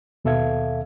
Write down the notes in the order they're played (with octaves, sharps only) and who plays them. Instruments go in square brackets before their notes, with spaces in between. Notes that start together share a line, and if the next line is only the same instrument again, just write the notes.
[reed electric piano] D#2 B2 A4 E5 F5 G#6